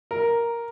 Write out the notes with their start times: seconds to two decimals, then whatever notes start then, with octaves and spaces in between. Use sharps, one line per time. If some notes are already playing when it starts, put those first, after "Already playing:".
0.11 A#4